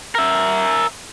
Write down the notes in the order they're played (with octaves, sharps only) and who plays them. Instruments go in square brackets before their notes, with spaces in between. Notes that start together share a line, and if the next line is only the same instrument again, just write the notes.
[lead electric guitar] A#4 E5